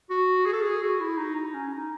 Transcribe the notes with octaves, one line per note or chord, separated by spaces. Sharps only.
F#4
G#4
A4
G#4
F#4
E4
D#4
D#4
C#4
D#4